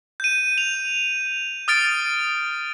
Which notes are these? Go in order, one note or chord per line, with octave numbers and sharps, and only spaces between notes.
G6 D#7
F7
D#6 F6 A6 D7